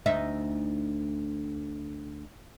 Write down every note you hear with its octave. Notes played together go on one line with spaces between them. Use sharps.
D2 D#4 E5